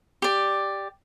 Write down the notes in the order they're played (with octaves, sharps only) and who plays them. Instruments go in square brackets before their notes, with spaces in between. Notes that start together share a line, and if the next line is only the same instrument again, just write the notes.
[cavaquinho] G4 D5